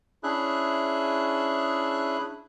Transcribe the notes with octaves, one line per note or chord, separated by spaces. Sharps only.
C#4 D4 E4 G#4 E5 F#6